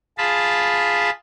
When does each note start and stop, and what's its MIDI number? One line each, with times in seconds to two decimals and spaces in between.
0.18 1.10 65
0.18 1.10 68
0.18 1.10 81
0.18 1.10 83